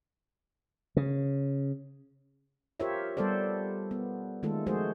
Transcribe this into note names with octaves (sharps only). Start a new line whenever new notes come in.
C#3
F4 G4 A#4 C5 C#5 E5
G3 B3 A4 C5 D5
B3
D#3 G#3 A3 F4 A4
F3 G#3 A3 F#4 G#4 C5